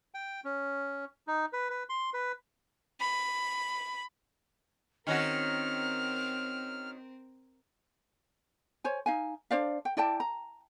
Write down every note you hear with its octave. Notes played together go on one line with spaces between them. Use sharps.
G5
C#4
D#4
B4
B4
C6
B4
B5
D#3 C4 C#4 F#4 A#4 F6
C5 C#5 G#5
D#4 F5 G#5
D4 C5 D5 F5
G5
E4 D5 G5 A5
A#5